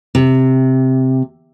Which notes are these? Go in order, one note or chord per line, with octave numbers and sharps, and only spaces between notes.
C3